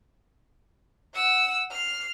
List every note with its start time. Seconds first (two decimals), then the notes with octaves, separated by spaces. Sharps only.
1.14 F#5 E6
1.71 F6 C7